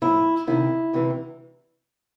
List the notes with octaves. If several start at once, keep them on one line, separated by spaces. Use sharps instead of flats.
A2 F3 E4
D2 C3 D#3 E4
D2 C3 E3